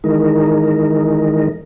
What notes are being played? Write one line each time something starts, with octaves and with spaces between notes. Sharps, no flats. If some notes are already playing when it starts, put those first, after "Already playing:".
D#3 E3 G#3 D#4 A#4